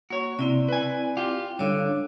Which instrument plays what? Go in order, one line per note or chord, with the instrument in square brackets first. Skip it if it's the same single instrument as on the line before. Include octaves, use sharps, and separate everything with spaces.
[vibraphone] A#3 [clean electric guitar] F#4 C#5
[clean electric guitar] C3 [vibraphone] C4 E4 D5
[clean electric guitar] B4 G#5
F4 G4
[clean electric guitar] G2 D3 [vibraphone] C#5 F5 D6